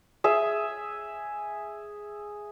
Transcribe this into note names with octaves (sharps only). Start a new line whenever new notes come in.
G#4 E5